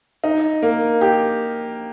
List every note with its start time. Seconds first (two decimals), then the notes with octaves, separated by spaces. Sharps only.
0.24 D#4
0.62 A#3
1.01 G4